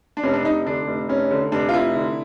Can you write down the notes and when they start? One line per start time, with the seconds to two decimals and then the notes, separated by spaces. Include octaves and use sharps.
0.17 D4
0.23 F1 C#4
0.33 D4
0.44 F1 D#4
0.66 D3 D4
0.87 F1
1.08 F1 C#4
1.31 D3
1.52 F1 D4
1.69 F4
1.73 F1 E4
1.95 D3